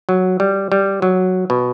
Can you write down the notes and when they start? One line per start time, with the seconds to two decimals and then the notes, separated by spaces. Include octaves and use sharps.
0.09 F#3
0.40 G3
0.72 G3
1.02 F#3
1.50 B2